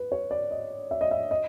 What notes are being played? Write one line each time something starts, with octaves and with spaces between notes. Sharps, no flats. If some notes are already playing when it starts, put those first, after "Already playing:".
Already playing: B4
C#5
D5
D#5
E5
D#5
E5
D#5